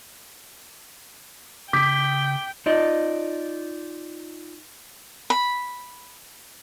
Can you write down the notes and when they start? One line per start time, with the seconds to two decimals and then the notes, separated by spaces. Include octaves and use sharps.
1.73 C#3 G5 D6 D#6 G6 B6
2.66 D#4 F4 D5 D#5
5.30 B5